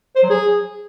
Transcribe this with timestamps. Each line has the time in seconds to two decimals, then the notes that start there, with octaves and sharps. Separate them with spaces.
0.16 C5
0.23 F#3
0.30 G#4